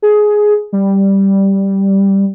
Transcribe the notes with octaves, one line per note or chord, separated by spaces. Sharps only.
G#4
G3